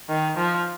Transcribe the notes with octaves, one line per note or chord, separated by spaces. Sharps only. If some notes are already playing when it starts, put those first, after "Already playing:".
D#3
F3